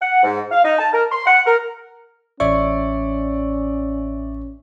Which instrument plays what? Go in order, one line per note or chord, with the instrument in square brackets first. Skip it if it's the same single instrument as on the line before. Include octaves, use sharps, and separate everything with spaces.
[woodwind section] F#5
G#2
F5
D#4
A5
A#4
C6
F#5
A#4
[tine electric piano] A1 C#5 C#6 [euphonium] C#4 [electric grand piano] D5 E5